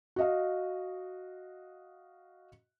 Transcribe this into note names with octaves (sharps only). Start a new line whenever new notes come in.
F#4 D#5 F5